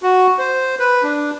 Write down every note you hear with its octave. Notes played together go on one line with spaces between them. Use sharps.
F#4
C5
B4
D4